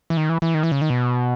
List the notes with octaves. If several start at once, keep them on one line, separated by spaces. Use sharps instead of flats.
E3
D#3
E3
E3
D#3
E3
C#3
D#3
B2